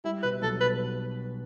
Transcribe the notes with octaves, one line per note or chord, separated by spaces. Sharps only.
G3 E4
B2 B4
B1 A4
B2 B4